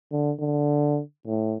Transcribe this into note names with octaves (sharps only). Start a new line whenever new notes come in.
D3
D3
A2